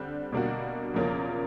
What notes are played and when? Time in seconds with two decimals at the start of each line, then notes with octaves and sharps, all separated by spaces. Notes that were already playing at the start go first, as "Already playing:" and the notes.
Already playing: D3 G3 C4
0.32 B2 G3 A#3 D4 F#4
0.94 E2 C#3 F3 A#3 C#4